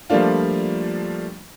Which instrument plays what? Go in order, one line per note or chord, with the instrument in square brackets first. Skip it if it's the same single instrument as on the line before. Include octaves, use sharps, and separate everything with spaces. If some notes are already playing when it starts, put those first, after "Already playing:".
[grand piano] F3 G3 A3 A#3 D4 F4